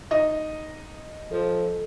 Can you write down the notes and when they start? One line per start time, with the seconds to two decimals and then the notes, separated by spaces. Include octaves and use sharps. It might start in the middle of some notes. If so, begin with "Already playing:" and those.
0.11 D#4 D#5
1.32 F3 A4